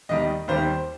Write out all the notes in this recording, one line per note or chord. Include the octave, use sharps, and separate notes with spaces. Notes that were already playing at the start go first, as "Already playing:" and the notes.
D#2 D#3 G3 D#5
D#2 D#3 G3 C5